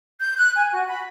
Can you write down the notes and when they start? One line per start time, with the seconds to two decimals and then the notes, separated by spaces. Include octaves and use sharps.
0.20 G6
0.38 F#6
0.56 G#5
0.73 F#4
0.88 B5